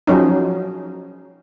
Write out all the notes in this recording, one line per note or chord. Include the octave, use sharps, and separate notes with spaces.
F3 F#3 C#4 D#4